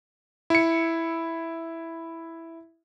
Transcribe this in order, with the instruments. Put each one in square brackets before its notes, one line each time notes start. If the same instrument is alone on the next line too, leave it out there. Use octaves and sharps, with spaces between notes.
[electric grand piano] E4 C#7